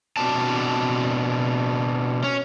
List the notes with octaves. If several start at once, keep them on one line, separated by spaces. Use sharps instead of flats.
B2 E3 C4 D4 D5 A5
C#4